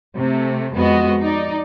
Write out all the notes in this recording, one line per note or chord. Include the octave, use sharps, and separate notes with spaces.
C3 A3
F2 G#3 B3 F#4 D#5
D#4 D5